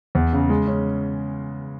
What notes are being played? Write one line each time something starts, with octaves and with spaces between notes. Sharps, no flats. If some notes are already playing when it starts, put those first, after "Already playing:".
E2
C#3
G#3
C#4